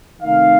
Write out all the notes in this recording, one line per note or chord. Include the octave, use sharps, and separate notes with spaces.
C3 D#3 A3 D#4 F5